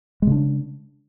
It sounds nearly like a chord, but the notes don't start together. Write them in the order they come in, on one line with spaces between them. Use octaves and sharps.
G#3 C#3 D4